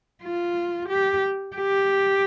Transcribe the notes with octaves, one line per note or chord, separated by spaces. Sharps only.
F4
G4
G4